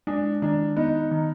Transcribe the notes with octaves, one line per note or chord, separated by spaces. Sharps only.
G#3 D4
D#3 D4
B3 D#4
D#3